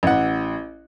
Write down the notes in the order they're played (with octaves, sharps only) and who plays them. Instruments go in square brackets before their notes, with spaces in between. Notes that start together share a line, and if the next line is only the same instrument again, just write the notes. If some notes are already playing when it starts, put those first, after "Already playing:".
[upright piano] A1 F#5